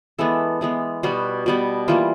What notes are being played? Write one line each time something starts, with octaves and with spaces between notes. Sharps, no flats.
E3 G#3 B3 A4
E3 G#3 B3
B2 G3 B3 F#4
B2 G3 B3
E3 G3 A#3 F4